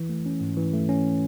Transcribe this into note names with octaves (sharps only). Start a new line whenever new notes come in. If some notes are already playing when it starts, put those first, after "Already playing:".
Already playing: E3
A3
C#4
G#2
E3
A3
C#4